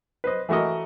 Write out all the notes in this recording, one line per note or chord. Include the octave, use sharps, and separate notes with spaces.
B4 C5 D#5
E3 A3 F#4 A#4 D#5